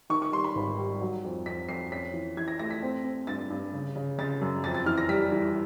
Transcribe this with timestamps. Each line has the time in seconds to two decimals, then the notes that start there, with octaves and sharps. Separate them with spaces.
0.10 D#3 C#6
0.22 C#6
0.32 G3 C6
0.44 B5
0.55 G#1
0.78 G3
1.01 F#3
1.24 F2
1.46 F2 B6
1.69 F2 C7
1.92 C#4 B6
2.14 E3
2.37 E3 G#6
2.48 A#6
2.59 A3 A#6
2.71 B6
2.82 C4
3.04 C4
3.27 G2 A6
3.50 G2
3.74 C#3
3.96 C#3
4.18 C#3 A6
4.41 F#2
4.64 F2 A6
4.75 A6
4.86 E3 F6
4.98 A#6
5.09 G3 B6
5.32 E3